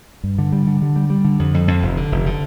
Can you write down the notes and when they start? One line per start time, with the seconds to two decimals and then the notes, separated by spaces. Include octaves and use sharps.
0.24 G2
0.39 D3
0.52 G3
0.67 D3
0.81 D3
0.96 G3
1.10 G3
1.25 D3
1.39 F2
1.54 F2
1.68 F2
1.82 F1
1.97 D3
2.12 F1
2.26 D3